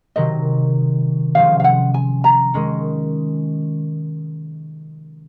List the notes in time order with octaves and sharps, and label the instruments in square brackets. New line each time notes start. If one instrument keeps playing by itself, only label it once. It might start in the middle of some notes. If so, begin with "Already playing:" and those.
[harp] C3 D#3 F#3 [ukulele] D#5
[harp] C3 F3 G#3 C#4 [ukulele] F5
[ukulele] F5
F#5
G#5
A#5
[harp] D#3 G#3 C#4